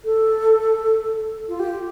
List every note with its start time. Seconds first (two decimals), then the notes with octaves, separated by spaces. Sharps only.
0.05 A4
1.49 F4
1.59 G4